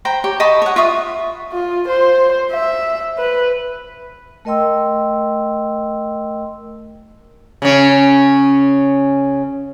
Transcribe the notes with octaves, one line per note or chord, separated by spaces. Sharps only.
C5 G5 A#5 B5
G4 C#5
D#5 A5 B5 C#6
C#5 F#5
F4 E5 C#6 D#6
F4
C5
E5
B4
A3 A#4 D#5 G5 C6 E6
C#3 C#4